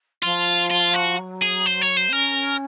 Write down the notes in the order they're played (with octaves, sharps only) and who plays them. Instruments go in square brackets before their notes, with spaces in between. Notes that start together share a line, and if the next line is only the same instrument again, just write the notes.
[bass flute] F3 [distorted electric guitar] F4
[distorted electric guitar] F4
F#4
[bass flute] F#3
[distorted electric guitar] G#4
C5
C#5
C5
[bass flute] C4
[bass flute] C#4 [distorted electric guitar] A#4